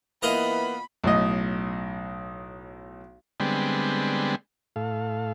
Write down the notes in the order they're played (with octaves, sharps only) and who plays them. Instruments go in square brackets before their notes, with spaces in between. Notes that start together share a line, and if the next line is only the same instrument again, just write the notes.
[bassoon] E3 [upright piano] A#3 B3 [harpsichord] F4 D#5 F#5 [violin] B5
[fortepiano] B1 A2 D#5
[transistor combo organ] D3 G3 G#3 B3 C4
A2 A4 F5